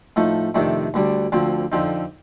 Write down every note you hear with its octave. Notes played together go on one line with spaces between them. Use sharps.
A2 F3 A3 D#4
F2 C3 D#3 A3 D4
D2 D3 G3 D4
D2 D3 F3 C4
F2 D3 F3 C4 D#4